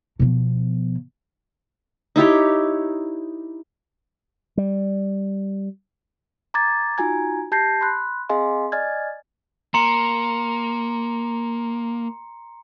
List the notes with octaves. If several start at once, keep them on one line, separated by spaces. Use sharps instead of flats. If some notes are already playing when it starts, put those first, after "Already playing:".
B2 F3
D#4 E4 G4 C#5
G3
A#5 D6 G#6 A6
D#4 F4 F#4 G#5 A#5 G#6
G4 A5 G6 G#6 A#6 C7
B5 C6 F#6
C4 G#4 D#5 F5 G#5 C6
D5 D#5 G#5 F6 G#6 A6
A#3 A#5 C6 C#7